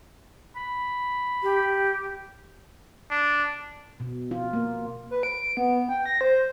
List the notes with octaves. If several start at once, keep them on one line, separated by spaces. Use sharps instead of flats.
B5
G4
D4
B2
F4
A#3
B4
D7
B3
G5
A#6
C5